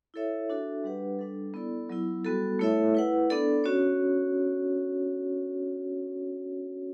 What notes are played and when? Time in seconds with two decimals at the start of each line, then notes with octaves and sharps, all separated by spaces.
0.14 E4 A4 C#5 E5
0.50 D4 F#4 A4 E5
0.84 G3 D4 G4 B4 F#5
1.19 G3 D4 A4
1.54 B3 E4 A4 D5
1.89 F#3 B3 E4
2.25 G3 B3 F#4 A4
2.59 A3 E4 A4 C#5 E5
2.95 E4 B4 F#5
3.30 B3 D4 A4 D5
3.64 C#4 F#4 C#5